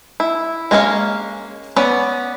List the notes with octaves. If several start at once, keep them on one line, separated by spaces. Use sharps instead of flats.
E4
G#3 A#3 C#4 F5
B3 C#4 D5